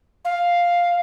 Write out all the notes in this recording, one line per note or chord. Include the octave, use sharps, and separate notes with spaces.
F5